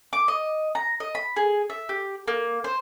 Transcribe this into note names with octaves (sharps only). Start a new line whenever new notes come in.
D6
D#5
A#5
D#5
B5
G#4
E5
G4
A#3
C5